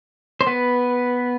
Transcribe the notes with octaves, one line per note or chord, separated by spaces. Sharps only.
C5
B3 B4